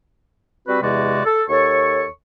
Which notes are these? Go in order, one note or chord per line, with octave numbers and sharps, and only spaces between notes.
G3 C4 F#4 B4
E2 C3 G#3 F#4 D5
A4
D#2 A4 C#5 C#6